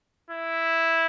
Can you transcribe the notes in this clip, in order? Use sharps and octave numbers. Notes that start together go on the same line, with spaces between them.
E4